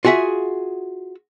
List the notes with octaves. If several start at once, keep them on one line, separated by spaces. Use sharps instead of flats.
F4 F#4 G#4 E5 F#5